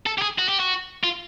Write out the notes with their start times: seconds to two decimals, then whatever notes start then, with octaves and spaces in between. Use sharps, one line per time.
0.06 A4
0.18 G4
0.22 G#4
0.38 F#4
0.49 G4
0.60 F#4
1.03 F4